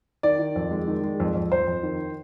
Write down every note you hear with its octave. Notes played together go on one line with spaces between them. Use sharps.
D#3 D5
D#3
F2
G#3
D#3
G#3
F2
F2
F2 C5
F2
D#3